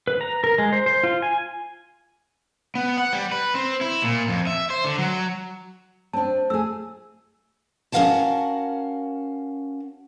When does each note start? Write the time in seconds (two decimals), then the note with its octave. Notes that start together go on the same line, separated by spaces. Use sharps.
0.07 B4
0.21 A#5
0.44 A#4
0.58 G#3
0.73 C5
0.86 C5
1.03 F4
1.22 G#5
2.75 B3
2.98 F#5
3.13 G3
3.32 B4
3.55 C4
3.81 E4
4.03 A#2
4.28 F2
4.47 E5
4.70 C5
4.84 D3
4.99 F#3
6.13 C4 D4 A5
6.50 A3 G#4 E6
7.92 C#4 F#4 A#4 F5 F#5 A5